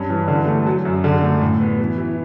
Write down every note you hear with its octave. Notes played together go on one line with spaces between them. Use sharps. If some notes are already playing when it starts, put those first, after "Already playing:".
Already playing: G2 C#4
E3
D3
A3
F#3
F#2
D3
A3
A2
B3
E3
E3